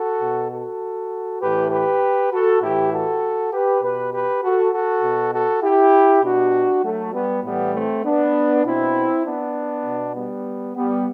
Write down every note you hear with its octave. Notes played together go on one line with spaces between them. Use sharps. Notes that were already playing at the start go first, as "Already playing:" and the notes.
Already playing: F#4 A4
B2
F#4 A4
A2 E3 G4 B4
G4 B4
F#4 A4
A2 E3 E4 G4
F#4 A4
G4 B4
B2 G4 B4
G4 B4
F#4 A4
F#4 A4
B2
F#4 A4
E4 G4
B2 D4 F#4
F#3 A3
G3 B3
A2 E3 G3 B3
A3 C4
B3 D4
B2 C4 E4
B3 D4
B2
G3 B3
G3 B3